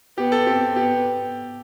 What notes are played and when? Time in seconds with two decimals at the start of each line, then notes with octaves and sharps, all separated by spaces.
0.18 B3 G4
0.32 A4
0.46 C4 G4
0.75 B3 G4